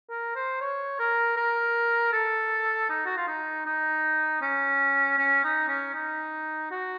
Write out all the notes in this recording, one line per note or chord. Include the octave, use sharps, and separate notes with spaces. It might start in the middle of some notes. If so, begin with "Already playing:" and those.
A#4
C5
C#5
A#4
A#4
A4
D#4
F#4
F4
D#4
D#4
C#4
C#4
D#4
C#4
D#4
F#4